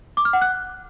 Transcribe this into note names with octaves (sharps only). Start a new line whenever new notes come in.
D6
F6
F#5
F#6